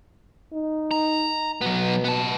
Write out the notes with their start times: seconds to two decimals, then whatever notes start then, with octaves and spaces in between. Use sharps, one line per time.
0.53 D#4
0.91 A#5
1.61 B2 F#3 B3
2.04 B3 A5